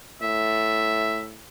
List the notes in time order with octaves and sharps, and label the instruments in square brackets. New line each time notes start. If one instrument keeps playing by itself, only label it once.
[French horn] A2 [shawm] E5